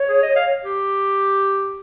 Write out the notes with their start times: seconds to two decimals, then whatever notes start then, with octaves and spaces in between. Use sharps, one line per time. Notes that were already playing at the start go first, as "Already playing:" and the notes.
Already playing: C#5
0.09 G#4
0.23 D#5
0.36 F5
0.64 G4